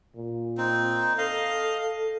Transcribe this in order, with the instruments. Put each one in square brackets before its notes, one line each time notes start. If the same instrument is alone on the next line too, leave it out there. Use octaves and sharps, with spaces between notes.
[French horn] A#2
[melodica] C4 D#4
[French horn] A4 [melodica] D#5 F5